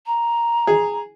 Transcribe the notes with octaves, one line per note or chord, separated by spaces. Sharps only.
A#5
G#4